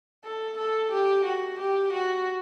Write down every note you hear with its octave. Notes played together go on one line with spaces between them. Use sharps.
A4
A4
G4
F#4
G4
F#4